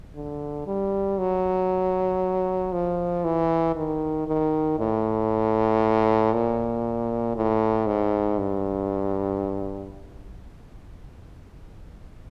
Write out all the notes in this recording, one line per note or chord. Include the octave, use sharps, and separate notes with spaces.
D3
G3
F#3
F3
E3
D#3
D#3
A2
A#2
A2
G#2
G2